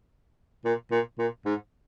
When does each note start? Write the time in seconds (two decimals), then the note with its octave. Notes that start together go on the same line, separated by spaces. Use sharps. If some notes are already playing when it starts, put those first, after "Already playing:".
0.65 A#2
0.91 A#2
1.19 A#2
1.46 G#2